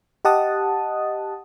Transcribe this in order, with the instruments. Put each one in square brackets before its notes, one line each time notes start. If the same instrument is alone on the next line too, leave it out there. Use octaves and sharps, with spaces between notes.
[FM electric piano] G4 D#5 F#5 A5 D#6